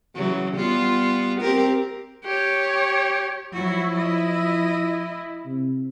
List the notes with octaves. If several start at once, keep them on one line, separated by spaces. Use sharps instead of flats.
C#3 E3 F#3
G3 B3 F4
C4 G4 A#4
G4 C#5
F3 F#3 E4 F#4
D#5
C3